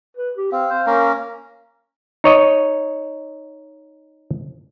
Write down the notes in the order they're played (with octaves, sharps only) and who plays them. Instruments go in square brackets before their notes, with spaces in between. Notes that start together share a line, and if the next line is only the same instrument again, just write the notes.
[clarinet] B4
G4
[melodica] C4 [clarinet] F5
[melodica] C5
A#3 C#4 A#4
[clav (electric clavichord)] D#4 C#5 D#5